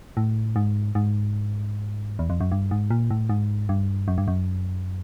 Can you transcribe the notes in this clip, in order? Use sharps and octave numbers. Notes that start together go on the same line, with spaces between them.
A2
G#2
G#2
E2
F2
F#2
G2
G#2
A#2
A2
G#2
G2
F#2
G2
F#2